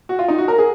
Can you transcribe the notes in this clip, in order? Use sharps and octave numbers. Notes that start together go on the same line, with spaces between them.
F#4
F4
D#4
F#4
A#4
G#4